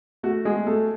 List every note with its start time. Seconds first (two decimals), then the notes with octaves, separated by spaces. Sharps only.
0.23 A3 F#4
0.45 G#3 G#4
0.53 A3
0.67 A3 A4